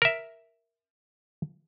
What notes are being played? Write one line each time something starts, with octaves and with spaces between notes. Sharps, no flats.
A#4 E5